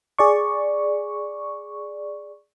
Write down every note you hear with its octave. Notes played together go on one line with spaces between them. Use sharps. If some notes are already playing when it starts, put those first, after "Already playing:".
G#4 D5 C#6